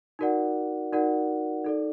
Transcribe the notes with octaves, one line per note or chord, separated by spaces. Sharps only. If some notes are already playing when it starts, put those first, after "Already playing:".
D#4 F#4 A#4 D5 F#5
D#4 F#4 A#4 D5 F#5
D#4 A4 D5